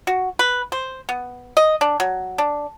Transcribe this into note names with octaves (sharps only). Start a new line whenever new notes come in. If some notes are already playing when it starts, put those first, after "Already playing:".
F#4
B4
C5
B3
D#5
D4
F#3
D4